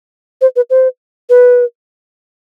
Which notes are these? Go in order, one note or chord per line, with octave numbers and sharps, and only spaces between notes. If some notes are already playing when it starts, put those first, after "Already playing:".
C5
B4
C5
B4